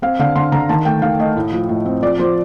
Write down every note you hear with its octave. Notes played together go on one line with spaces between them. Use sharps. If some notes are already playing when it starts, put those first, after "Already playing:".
C4 F5
D3 F5
D3 C6
D3 A#5
D#3 A5
A3 G5
D#3 F5
A3 D#5
A2
F3
A2
C4
F3 D5
F3 C5